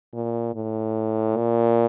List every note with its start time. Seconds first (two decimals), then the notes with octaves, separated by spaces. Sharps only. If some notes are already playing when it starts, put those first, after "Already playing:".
0.13 A#2
0.54 A2
1.37 A#2